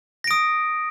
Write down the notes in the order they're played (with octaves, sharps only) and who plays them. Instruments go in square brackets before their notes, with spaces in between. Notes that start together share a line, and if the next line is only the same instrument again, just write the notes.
[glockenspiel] A#6
D7
D#6